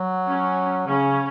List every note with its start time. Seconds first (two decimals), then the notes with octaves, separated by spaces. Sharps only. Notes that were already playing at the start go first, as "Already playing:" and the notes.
Already playing: F#3
0.29 C#4
0.88 C#3 C#4